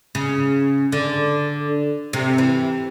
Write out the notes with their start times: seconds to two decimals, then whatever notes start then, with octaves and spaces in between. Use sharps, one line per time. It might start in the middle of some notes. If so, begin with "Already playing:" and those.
0.15 C#3
0.92 D3
2.13 C3
2.38 E3